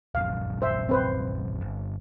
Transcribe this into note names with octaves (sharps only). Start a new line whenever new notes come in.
D#1 A#1 F#2 F5
C5 E5
C4 B4 C5
G1